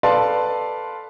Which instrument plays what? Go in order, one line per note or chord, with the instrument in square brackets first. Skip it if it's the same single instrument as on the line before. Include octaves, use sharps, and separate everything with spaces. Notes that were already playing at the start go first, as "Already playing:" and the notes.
[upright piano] A4 B4 D5 F5 A5 C6